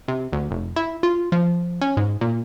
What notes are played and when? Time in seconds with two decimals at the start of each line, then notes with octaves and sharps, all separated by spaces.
0.08 C3
0.33 D2
0.51 F1
0.76 E4
1.03 F4
1.32 F3
1.81 C#4
1.97 G#2
2.21 A#2